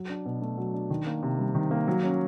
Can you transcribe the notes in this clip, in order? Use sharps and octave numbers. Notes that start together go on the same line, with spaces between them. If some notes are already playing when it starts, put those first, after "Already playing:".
Already playing: F#3
D4
B2
A3
F#3
D4
D#3
A#3
C3
G3
D#3
A#3
F#3
C#4